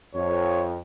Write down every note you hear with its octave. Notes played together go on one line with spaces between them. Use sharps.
F2 C#5